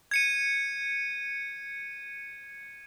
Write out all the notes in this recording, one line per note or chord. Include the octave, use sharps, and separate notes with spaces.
G#6 C#7 D#7